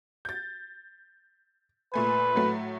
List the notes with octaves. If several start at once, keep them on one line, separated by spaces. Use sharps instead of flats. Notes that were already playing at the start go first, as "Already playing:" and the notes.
G6 A6
A#2 A3 B4 G#5
A2 F#3 A3